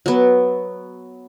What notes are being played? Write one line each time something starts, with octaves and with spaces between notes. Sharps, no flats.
F#3 B3